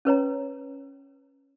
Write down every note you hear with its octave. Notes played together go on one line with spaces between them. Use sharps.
C#4 B4 C#5 A#5